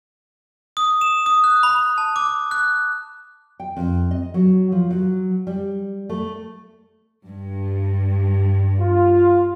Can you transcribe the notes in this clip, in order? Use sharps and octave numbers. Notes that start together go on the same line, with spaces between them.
D#6
E7
D#6
F#6
B5
A5
D6
F#6
G5
F2
D#5
F#3
F3
F#3
G3
A3
G2
F4